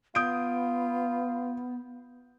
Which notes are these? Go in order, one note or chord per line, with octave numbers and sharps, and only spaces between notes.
B3 F4 D#6 G6 D7